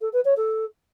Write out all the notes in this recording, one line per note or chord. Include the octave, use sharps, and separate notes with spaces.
A4
B4
C#5
A4